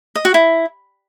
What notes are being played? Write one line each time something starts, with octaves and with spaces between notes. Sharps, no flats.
D#5
F#4
E4